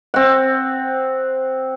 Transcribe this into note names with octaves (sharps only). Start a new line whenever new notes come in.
C4 F#5